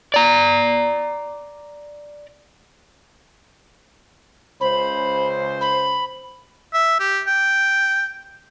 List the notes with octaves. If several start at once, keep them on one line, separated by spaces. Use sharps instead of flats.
D5 A#5
C#2 C#3 C5 B5
B5
E5
G4
G5